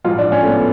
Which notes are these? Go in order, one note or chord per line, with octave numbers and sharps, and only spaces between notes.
A1 G#2 F3 F4
D4
C#4
A3
B3